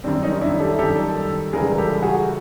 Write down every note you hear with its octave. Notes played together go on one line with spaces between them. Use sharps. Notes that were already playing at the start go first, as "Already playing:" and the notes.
F#2 D#3 G3 C4 D4
C#4 D#4
D4 E4
G4 A4
F#2 D#3 G3 G4 A4
C#2 C#3 E3 G3 G#4 A#4
G4 A4
F#4 G#4